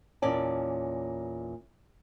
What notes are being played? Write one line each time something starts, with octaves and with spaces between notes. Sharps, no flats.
E2 A#2 C#4 D5 A5